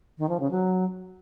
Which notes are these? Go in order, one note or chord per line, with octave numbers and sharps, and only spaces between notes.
D#3
F3
C#3
F#3